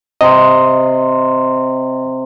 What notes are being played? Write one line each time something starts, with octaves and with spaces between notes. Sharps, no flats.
C3 D#5 C6